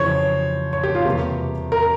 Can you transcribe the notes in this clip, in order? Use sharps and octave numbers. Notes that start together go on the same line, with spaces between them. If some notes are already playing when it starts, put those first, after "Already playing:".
Already playing: F2 C#3 E3 C5 C#5
C#5
G4
F4
E2 C3 G3 A#3 G4
A#4